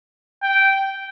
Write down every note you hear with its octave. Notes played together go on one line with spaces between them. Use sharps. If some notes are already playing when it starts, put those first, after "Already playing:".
G5